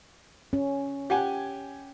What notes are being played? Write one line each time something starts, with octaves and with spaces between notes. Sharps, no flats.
C#4
G4 F#5 G#5